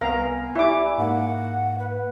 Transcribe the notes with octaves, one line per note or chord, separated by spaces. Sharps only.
C2 B3 A#4 F5 G#5 A#5
E4 G4 D5 E5 D6
G#2 A#3 F#5
B4